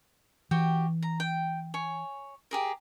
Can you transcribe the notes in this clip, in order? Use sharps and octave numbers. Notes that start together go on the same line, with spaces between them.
E3 F#4 G4 G5
A#5
G5
C#5 G#5
G4 G#4 A#4